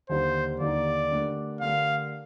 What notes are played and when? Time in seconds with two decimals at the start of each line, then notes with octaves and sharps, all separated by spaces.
0.09 D#2 D3 G3 A#3 D#4 C5
0.60 D#2 D3 G3 A#3 D#4 D5
1.11 D3 A3 D4 G4 A#4
1.61 D3 A3 D4 G4 A#4 F5